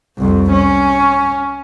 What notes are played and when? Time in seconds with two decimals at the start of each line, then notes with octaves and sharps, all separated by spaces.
0.18 C2 F2
0.52 C#4